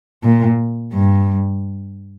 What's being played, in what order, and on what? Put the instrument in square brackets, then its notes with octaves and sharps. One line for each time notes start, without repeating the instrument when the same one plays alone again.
[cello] A#2
G2